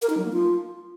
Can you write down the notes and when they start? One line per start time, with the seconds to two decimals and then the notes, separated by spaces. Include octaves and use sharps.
0.02 A#4
0.10 D#4
0.17 F#3
0.25 A#3
0.32 F4